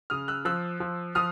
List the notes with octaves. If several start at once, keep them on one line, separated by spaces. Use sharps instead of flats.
C#3 D#6 F6
E6 F#6
F3 E6 F#6
F3
F3 D#6 F6